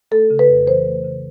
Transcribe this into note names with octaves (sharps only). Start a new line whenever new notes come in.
A3 A4
C#3
B4
F2
E3 C5
A3
C#3